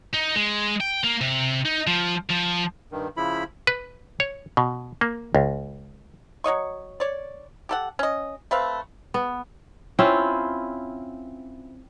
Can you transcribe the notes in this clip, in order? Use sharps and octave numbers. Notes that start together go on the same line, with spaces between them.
D#4
G#3
G5
A#3
C3
D#4
F3
F3
G2 D#3
C#3 F3 E4 B5
B4
C#5
B2
A#3
C#2
F#3 C#5 D#5 C#6
C#5 D5
G4 A4 F#5
C#4 D#5
A3 C4 B4 F5
B3
C4 C#4 E4 F4